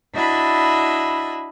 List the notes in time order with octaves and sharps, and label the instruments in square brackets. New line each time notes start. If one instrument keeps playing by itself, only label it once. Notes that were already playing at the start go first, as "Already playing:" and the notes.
[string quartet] D4 E4 F#4 D#5 E5 B5